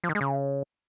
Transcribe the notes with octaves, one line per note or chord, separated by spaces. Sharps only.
F3
D#3
G#3
C#3